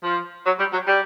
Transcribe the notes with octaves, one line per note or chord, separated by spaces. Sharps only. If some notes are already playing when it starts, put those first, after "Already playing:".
F3
F#3
G3
F#3
G3